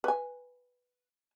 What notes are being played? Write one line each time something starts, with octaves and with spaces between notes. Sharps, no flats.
B4 G#5